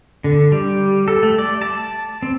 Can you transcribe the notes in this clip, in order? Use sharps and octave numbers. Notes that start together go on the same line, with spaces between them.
D3
G3
A4
A3
D5
A5
C4